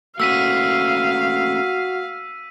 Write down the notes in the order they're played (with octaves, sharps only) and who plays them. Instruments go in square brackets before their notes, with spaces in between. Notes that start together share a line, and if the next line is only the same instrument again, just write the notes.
[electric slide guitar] A3 A#3 C#4 [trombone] F#4 [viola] F5 [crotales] E6 B6 D#7